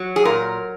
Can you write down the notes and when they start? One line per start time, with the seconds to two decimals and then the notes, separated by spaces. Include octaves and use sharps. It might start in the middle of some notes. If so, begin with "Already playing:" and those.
Already playing: F#3
0.16 G#4
0.25 A#2 A#4